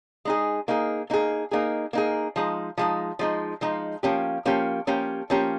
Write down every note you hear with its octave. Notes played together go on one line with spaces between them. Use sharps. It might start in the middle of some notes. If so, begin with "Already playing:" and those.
G#3 D#4 G#4
A#3 D#4 G#4
A#3 D#4 G#4
A#3 D#4 G#4
A#3 D#4 G#4
F3 G#3 D#4
F3 G#3 D#4
F3 G#3 D#4
F3 G#3 D#4
F3 A#3 C#4 G4
F3 A#3 C#4 G4
F3 A#3 C#4 G4
F3 A#3 C#4 G4